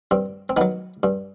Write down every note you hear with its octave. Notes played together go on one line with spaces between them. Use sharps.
G2 C4
C4
D#3 F#3 B3
G2